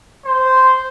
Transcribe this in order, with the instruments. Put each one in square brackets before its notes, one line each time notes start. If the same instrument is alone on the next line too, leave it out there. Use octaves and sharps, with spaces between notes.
[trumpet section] C5